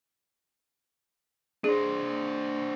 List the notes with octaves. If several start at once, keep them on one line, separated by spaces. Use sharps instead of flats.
D4 G#4 C5